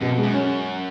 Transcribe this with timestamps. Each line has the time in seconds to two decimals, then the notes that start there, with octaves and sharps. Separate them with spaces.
0.01 F#2 B2
0.12 F2
0.18 G#3
0.23 F#2
0.34 C#4